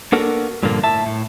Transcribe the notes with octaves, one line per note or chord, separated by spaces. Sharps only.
A#3 B3 D4 F#4 A4 A#4
G2 A#2 D3 F3 A#3
A2 E5 A5
A2